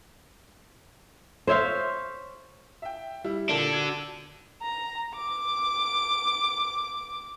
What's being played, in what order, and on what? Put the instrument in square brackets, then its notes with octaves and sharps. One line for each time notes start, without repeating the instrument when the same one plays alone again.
[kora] C5 C#5 E5 F5
[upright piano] E5 G5
G3 E4
[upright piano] A#2 A#3 [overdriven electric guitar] D4 A4
[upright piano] F#4 E6 G#6
[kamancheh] A#5
D6